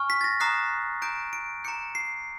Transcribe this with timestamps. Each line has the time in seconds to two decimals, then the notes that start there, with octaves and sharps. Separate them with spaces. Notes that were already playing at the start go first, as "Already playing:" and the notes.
Already playing: G#5 C#6 F6
0.10 B6
0.21 A6
0.24 A#6
0.40 A#5 D#6 F#6 C7
1.02 A#5 D#6 G6 D7
1.33 D7
1.64 A#5 D6 G6 C#7
1.95 C7